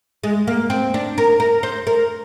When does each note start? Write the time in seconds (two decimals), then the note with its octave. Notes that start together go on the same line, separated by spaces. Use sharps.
0.24 G#3
0.47 A#3
0.70 C4
0.94 D4
1.18 A#4
1.40 A#4
1.63 C5
1.87 A#4